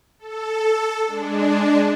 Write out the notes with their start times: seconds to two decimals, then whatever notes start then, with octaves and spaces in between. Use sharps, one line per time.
0.19 A4
1.07 G#3 D4